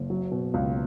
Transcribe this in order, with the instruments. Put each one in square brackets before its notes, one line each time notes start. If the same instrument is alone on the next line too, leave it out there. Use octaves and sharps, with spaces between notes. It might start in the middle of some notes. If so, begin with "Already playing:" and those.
Already playing: [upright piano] F#1
F#3
B2
C#2